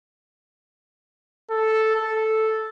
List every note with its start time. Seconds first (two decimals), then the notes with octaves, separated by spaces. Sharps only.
1.51 A4
1.95 A4